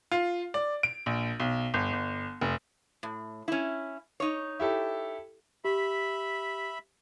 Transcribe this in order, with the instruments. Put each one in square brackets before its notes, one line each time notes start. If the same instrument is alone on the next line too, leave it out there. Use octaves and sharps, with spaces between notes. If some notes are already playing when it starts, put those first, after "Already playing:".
[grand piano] F4
D5
D7
A#1
B1
G1
G1
F1
[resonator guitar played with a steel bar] A2
C#4 E4
D#4 C#5
[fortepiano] E4 G4 A4
[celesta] G4 [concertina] E5 B5